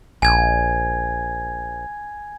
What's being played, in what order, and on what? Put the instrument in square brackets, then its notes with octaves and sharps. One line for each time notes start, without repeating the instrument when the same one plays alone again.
[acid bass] A#1 [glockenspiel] G#5 G#6